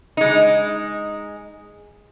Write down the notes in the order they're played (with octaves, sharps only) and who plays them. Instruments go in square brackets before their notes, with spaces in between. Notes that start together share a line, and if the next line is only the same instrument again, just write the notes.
[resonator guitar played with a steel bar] G#3 D#4